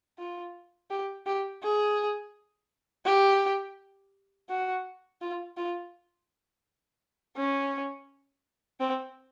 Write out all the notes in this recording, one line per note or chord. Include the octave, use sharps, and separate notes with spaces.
F4
G4
G4
G#4
G4
F#4
F4
F4
C#4
C4